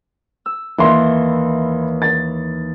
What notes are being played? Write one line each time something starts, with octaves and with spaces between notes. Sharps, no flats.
E6
D#2 E3 E4 C6
A6